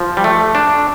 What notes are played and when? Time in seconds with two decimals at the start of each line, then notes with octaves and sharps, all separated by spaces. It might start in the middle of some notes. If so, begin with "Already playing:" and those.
Already playing: F3
0.17 G3
0.24 A3
0.55 D4